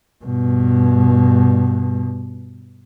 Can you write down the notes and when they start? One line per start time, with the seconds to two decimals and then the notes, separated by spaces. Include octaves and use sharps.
0.24 G2 B2